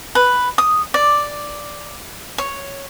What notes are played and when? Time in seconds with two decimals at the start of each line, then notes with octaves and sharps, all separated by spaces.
0.15 B4
0.58 D#6
0.94 D5
2.38 C#5